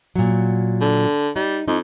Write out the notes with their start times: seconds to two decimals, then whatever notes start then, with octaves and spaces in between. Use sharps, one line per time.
0.15 A#2 F#3
0.81 D3
1.36 G3 D#4
1.68 F2 D#4